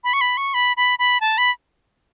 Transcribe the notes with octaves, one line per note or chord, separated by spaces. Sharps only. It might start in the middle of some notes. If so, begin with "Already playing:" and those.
B5
C#6
B5
C#6
B5
B5
B5
A5
B5